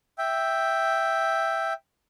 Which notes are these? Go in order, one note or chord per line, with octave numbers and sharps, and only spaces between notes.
E5 G5